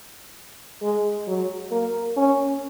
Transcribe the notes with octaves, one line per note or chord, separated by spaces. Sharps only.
G#3
F#3
A#3
C#4